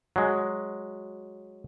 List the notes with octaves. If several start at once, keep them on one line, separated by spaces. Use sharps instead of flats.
F#3 G#3